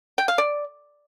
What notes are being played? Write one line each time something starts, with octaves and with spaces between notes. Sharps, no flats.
G5
F5
D5